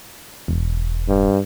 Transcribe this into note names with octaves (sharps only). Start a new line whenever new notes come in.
E1
G2